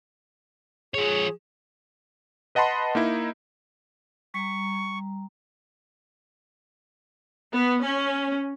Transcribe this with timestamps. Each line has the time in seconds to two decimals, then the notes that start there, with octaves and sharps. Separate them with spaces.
0.94 F3 G#4 C#5
2.55 B4 D#5 F#5 A5 B5 C6
2.95 A#3 D#4 E4
4.34 G3 A#5 C#6
7.53 B3
7.83 C#4